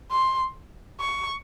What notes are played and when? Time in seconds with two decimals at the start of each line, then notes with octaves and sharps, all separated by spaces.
0.11 C6
1.00 C#6